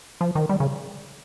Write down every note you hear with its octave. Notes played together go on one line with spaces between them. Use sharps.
F3
D#3
G3
C#3